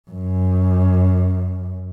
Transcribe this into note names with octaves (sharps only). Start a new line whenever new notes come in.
F#2